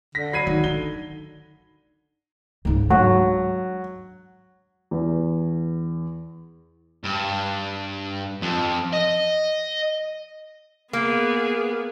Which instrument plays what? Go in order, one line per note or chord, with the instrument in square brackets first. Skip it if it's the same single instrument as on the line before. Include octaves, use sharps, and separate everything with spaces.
[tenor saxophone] D3 [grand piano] A#6 [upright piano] B6
[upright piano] F#3 C7 [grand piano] B5 G#6 D#7
[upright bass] D#3
[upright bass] D#4 [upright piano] G7
[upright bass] C#2 G#2
[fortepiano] F#3 [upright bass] G#3 D4
[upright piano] E2
[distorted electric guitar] G2
F2
D#5
[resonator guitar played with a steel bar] A#3 [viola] B3 G#4